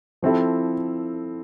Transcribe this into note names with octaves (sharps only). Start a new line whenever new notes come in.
F3 C4 E4 A4